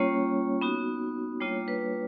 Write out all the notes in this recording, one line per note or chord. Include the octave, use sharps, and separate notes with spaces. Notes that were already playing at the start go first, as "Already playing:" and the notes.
Already playing: G3 A#3 C#4 F4 C#5
B3 D#4 F#4
G3 A#3 D4 F4 C#5
B4